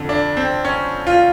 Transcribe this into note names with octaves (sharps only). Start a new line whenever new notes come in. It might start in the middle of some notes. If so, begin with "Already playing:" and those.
Already playing: F2 D3
D4
C4
C#4
F4